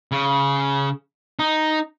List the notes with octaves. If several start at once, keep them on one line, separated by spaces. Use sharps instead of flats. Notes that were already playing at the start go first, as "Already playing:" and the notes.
C#3
D#4